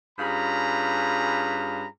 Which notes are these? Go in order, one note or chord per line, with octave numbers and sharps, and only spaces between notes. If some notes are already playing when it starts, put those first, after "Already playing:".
G2 C#4 F4 G#4 A#5 B5